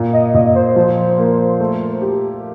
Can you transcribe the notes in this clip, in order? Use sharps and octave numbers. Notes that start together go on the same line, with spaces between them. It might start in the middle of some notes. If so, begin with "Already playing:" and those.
Already playing: A#2
D#5
A#2 D#5
C5
F3
A#3
A3
G4